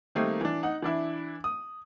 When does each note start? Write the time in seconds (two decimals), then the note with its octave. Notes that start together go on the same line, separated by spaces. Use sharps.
0.15 D#3 G3 A3 A#3 C4 D#4
0.41 E3 D4
0.63 D#4 F#5
0.82 E3 D4 E4
1.44 D#6